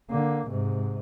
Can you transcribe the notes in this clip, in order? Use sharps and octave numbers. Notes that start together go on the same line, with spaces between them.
D3 A#3
G#2 C3